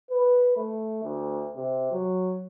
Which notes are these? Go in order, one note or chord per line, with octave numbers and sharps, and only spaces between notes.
B4
A3
D2
C3
F#3